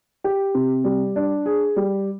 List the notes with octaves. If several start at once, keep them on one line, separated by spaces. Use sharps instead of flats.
G4
C3
G3
D4
G#4
G3